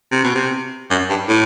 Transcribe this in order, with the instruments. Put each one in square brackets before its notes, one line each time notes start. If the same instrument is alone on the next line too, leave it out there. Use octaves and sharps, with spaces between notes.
[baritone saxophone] C3
B2
C3
F#2
G2
A2